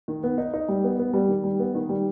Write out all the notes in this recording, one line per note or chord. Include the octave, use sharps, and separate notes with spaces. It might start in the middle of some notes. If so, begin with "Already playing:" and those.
D#3
B3
D#4
D#4
G3
B3
B3
G3
D#3
G3
B3
D#3
G3